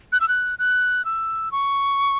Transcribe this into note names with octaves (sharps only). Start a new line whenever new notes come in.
F#6
E6
F#6
F#6
E6
C#6